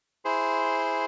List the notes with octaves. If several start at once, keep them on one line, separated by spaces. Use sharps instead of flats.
E4 G#4 C5 C6